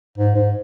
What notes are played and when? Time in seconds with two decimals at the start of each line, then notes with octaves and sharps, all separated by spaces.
0.18 G#2
0.35 G#2